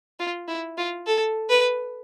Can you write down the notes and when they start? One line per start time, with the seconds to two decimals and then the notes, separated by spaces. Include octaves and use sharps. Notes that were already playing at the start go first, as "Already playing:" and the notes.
0.20 F4
0.48 E4
0.78 F4
1.07 A4
1.49 B4